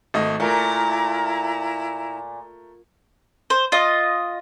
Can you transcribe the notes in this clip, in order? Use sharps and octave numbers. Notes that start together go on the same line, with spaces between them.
G#1 A3 D#5
A#2 A3 E4 A#4 A#5
C5
F4 D#5